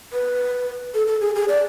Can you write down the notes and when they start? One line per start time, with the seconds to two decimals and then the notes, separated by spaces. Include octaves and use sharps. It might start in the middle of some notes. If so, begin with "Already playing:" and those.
0.13 B4
0.95 A4
1.07 A4
1.21 G#4
1.35 G#4
1.48 D5